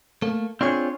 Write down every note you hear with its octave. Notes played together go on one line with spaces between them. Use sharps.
A3 A#3
C4 D4 F4 G#4 C#5